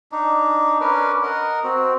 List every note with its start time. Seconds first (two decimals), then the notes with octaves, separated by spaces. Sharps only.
0.12 D4 D#4
0.81 C#4 D4 A#4 B4
1.23 A#4 D#5 F#5
1.64 C4 F#4